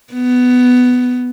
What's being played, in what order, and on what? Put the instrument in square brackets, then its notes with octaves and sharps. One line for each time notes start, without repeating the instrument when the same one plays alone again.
[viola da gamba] B3